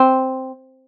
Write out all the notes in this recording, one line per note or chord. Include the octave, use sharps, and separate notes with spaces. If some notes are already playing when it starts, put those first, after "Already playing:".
Already playing: C4